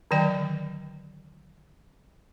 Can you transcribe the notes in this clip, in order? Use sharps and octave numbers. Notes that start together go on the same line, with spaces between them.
D3 D#3 F#3 D5 G5